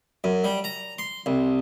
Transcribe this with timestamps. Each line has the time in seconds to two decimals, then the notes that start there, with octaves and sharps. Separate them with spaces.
0.24 F#2
0.44 G3
0.64 A#5
0.99 C6
1.26 C2